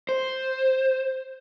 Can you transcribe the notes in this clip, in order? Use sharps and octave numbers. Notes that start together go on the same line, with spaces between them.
C5